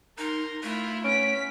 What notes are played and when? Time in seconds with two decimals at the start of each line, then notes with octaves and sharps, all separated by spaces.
0.18 D#4 A#4 C6
0.63 A3 E4 F4
1.04 B3 C#4 B6 D7